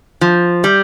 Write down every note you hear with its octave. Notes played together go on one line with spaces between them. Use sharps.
F3
G3